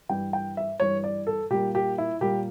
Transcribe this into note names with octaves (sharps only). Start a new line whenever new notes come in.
G2 E3 G3 G5
G5
E5
G2 E3 G3 C#5
D5
A4
A#2 G3 A#3 G4
G4
E4
A#2 G3 A#3 G4